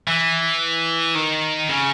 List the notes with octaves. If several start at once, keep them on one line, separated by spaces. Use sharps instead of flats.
E3
D#3
C#3